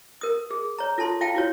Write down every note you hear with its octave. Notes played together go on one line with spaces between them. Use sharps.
A#4 D#6
G#4
C#5 A#5
F4 A4 A5 C6
F4 F5 G5 A5
E4 F#4 C#5